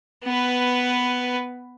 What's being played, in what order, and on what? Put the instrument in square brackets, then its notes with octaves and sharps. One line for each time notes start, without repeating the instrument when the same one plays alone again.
[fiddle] B3 B4